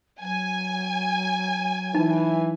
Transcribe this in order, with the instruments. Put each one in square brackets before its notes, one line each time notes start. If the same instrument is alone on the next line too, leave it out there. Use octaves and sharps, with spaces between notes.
[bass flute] F#3 [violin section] G#5
[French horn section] E3 [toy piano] D#4